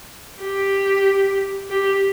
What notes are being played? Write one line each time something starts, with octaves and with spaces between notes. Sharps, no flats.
G4
G4